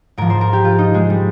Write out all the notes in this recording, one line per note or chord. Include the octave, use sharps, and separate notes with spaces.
G#2 F3 A#4
C5
A#4
G4
F4
D#4
G#3
G3